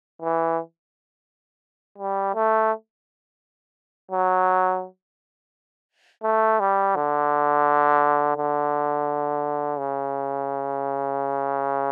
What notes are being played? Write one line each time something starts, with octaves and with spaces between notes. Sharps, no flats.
E3
G3
A3
F#3
A3
G3
D3
D3
C#3